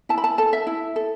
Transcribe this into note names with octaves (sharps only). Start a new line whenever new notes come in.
E4 A5
B5
A5
A4 A5
E5
E4
A4